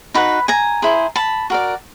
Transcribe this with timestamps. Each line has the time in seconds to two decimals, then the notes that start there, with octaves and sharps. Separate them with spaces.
0.14 D#4 F#4 B4 B5
0.48 G#5 A#5
0.82 E4 G#4 C5
1.16 A5 B5
1.50 F#4 A#4 D5